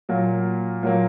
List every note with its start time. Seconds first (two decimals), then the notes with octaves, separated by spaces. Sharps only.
0.09 A#2 F#3 A#3
0.83 A#2 F#3 A#3